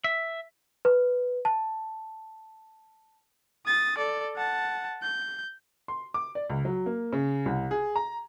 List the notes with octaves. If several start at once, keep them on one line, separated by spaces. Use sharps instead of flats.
E5
B4
A5
D#6 A6
A4 D5
F#5 A5
G6
C6
D6
D5
C#2
F#3
A#3
C#3
C2
G#4
A#5